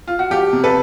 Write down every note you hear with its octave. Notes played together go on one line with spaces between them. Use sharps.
F4
F#4
F3 F4 G4
C3
A4 B4